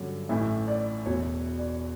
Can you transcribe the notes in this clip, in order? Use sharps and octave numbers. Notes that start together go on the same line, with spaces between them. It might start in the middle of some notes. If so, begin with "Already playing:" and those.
Already playing: G2 D3 F#3 C#4
A1 A2 E3 E5
D5
E1 E2 B2 C#5
D5